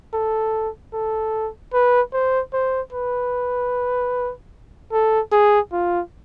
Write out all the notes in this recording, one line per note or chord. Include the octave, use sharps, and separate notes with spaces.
A4
A4
B4
C5
C5
B4
A4
G#4
F4